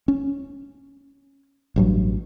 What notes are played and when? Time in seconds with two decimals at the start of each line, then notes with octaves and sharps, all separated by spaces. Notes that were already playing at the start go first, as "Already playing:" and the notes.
0.08 C#4
1.76 A1 G2 F#3